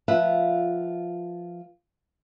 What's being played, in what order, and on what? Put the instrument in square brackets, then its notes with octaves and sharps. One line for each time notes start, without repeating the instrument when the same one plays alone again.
[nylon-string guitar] F3 F4 B4 E5 F#5